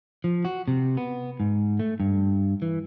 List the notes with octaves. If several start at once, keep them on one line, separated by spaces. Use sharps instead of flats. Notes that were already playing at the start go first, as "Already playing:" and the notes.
F3
F#4
C3
B3
G#2
A3
G2
E3